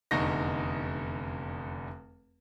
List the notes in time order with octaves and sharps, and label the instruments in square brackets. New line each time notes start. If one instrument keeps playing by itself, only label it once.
[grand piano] F1 E2 D3 D#4 C#6 A#6